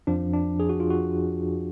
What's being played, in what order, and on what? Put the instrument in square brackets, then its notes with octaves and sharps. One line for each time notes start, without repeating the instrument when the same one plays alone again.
[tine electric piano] F2 F3 D4
D4
G#4
F#4
F4
F#4